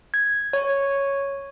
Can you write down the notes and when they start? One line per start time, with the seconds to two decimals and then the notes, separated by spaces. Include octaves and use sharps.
0.14 G#6
0.53 C#5